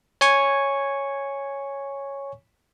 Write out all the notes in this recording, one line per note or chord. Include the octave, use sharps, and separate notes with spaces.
C#5 G#5 C#6